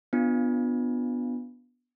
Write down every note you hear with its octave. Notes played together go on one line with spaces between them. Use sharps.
B3 D4 F4